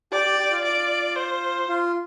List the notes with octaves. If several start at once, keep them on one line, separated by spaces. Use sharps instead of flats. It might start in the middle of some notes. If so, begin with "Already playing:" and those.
G4 D5
G4
G4
F4
D5
C5
F4